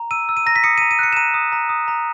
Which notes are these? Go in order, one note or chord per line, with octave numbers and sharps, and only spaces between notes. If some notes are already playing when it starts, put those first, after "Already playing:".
Already playing: A#5
E6 D#7
E6
D#7
A#5 A#6
B6
D#6 C#7
D#7
A#5
D#7
F#6 C#7
E7
A#5 D#7
D#6
A#5
D#6
A#5